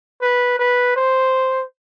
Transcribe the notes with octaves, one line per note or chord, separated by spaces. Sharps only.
B4
B4
C5